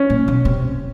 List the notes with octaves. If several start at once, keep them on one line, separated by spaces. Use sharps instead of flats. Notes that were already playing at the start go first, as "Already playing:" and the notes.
Already playing: C#4
A#2
B2
C3